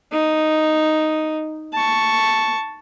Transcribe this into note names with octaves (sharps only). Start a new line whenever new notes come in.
D#4
A5 C#6